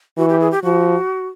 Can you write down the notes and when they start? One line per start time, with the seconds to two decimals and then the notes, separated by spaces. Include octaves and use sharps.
0.17 E3 F#4
0.29 G4
0.40 G#4
0.51 G4
0.63 F3 F#4